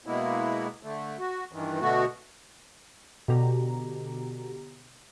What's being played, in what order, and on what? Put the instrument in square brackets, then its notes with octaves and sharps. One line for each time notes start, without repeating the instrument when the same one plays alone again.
[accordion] B2 G#3 A#3 B3 E4
D3 A3
F#4
G2 D#3 E3
B2 D3 A3 B3 F#4
[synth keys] B2 D3 G4 A#5